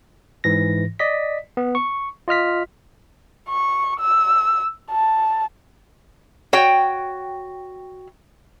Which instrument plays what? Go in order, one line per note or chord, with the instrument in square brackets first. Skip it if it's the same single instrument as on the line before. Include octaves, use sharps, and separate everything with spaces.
[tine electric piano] G#2 E3 A#6
D5 D#5 B6
B3
C#6
F4 D#5 F6 B6
[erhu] C#6
E6
A5
[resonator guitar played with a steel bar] F#4 C#5 G5